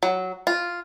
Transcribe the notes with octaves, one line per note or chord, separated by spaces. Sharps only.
F#3
F4